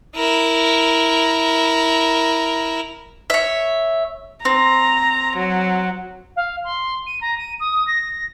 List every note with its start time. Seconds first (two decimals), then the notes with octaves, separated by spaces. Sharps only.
0.15 E4 A#4
3.30 C#5 E5
4.45 C4 A#5
5.37 F#3
6.36 F5
6.64 C6
7.06 D#7
7.21 A#5
7.38 D#7
7.60 D#6
7.87 A#6